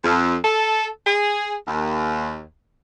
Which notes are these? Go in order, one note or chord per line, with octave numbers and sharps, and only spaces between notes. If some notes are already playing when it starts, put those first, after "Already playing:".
F2
A4
G#4
D#2